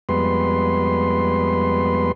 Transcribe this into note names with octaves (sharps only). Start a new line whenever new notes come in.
F2 G3 G#3 B3 B4 C6